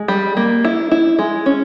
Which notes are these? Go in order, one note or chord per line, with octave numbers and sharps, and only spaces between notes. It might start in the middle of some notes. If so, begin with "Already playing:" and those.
Already playing: G#3
G3
A#3
E4
E4
G#3
C#4